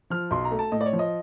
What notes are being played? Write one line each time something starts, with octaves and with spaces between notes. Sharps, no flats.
F3 F6
B1 C6
A#5
A3
A5
A2 D#5
D5
C#5
F3
D#5